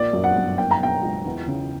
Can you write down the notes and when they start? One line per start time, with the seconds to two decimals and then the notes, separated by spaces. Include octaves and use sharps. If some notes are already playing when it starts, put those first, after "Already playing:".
Already playing: A#1 A#3 D5
0.13 F#2
0.24 F#5
0.35 G1
0.58 A#3 G5
0.71 A#5
0.80 B2 G5
1.02 C#2
1.25 E2
1.48 C#3